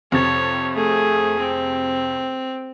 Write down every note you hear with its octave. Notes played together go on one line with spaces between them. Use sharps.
F2 C3 C#5 A6
A3 G#4
C4